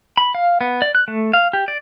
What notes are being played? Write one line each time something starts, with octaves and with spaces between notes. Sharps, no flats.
B5
F5
B3
D5
F#6
A3
F5
G4
D5